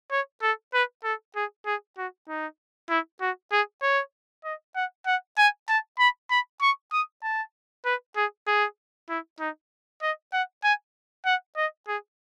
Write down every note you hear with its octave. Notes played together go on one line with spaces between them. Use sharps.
C#5
A4
B4
A4
G#4
G#4
F#4
D#4
E4
F#4
G#4
C#5
D#5
F#5
F#5
G#5
A5
B5
B5
C#6
D#6
A5
B4
G#4
G#4
E4
D#4
D#5
F#5
G#5
F#5
D#5
G#4